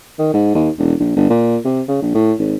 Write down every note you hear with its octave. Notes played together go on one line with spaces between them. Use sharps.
D#3
G#2
D#2
E1
A#1
G1
A#2
C3
C#3
A#1
A2
G#1